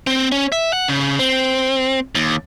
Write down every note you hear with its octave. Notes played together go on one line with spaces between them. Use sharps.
C4
C#4
E5
F#5
C#3
C4
D#2